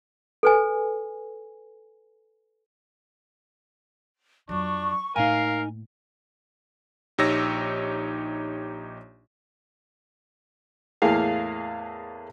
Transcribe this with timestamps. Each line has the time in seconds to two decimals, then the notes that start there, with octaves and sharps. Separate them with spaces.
0.43 A4 B4 G#5
4.49 F2 F#3 D4 C#6
5.16 A2 A#3 D#4 A#4 F5 G#5
7.18 A#1 D#4 G4 C#5 E6 A#6
11.02 E2 A2 A#3 G#4 F5